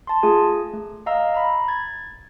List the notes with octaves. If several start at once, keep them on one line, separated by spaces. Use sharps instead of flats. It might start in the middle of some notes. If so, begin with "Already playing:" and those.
A5 C6
A3 F4 G#4 G#5
A3
D#5 F5 A#5 E6
A#5 B5
G#6 A6